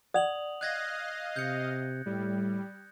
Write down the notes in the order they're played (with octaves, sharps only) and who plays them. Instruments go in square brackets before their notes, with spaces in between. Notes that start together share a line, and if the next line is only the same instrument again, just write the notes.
[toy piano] D5 F#5 [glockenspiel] D#6 F7 F#7
[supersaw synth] D#5 F5 [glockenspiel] F#6 G#6 A#6
[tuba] C3 [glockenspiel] G6 C#7
[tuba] A2 [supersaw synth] G3